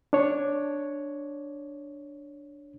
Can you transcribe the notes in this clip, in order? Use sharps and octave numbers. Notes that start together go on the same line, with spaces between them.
D4 C#5